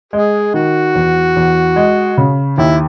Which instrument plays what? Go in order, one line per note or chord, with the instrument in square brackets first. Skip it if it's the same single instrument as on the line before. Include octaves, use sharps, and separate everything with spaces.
[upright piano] G#3 [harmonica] G#4
[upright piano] D#3 [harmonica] F#4
[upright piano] E2
E2
G#3
C#3
[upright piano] D#2 [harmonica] E4